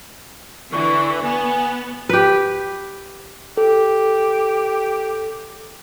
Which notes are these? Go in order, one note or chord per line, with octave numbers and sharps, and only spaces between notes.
D3 E3 C#6
B3 G#5
G4 B4
G4 A4